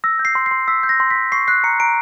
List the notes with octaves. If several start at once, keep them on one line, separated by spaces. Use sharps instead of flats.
E6 A#6
G6
C7
C6
C7
C6
E6 B6
G6
A#6
C6
B6
C6
C#6 C7
F#6 C7
A#5 C#7
A#5 D7